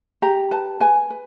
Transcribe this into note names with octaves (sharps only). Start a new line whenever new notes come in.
G4 A#5
B4 A5
B4 G#5
B4